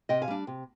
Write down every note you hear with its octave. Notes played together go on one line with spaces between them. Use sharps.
C3 D#5 G5
F5 G#5
G3 D4
C3